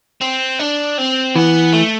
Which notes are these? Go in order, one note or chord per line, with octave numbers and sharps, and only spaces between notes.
C4
D4
C4
E3 B3
A3